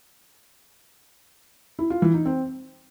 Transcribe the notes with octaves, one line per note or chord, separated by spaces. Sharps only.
E4
F4
E3
D#4
C4